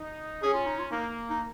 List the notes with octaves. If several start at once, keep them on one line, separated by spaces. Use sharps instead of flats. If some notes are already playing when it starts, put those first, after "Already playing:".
Already playing: D#4
C#4 G#4
F4
D#4
F4
A#3 D#4
D#4